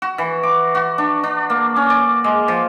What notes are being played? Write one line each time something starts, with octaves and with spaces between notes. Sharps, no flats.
F#4
E3
D6
F#4
D4
D4
A#3
C#4
D5
G#3
F3